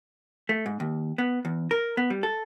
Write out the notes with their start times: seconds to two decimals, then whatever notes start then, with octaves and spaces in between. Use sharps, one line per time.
0.49 A3
0.66 G#2
0.80 D#2
1.18 B3
1.45 E2
1.71 A#4
1.97 B3
2.10 G3
2.23 A4